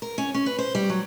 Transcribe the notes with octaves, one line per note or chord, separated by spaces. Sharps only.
A#4
C#4
C#4
B4
C5
G3
F#3